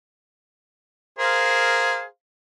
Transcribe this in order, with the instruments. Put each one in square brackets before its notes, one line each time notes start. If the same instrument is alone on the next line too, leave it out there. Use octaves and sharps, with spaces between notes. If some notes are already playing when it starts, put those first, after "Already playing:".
[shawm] G#4 [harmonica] A#4 C5 F5